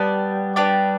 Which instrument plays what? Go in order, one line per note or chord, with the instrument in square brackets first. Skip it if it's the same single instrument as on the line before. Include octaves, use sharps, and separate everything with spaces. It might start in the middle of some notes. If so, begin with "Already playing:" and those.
Already playing: [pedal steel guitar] G3 [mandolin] B3 D4 G4 D5
[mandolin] B3 D4 G4 D5